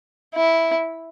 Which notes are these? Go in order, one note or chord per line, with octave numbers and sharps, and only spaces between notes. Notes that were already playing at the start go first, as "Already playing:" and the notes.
E4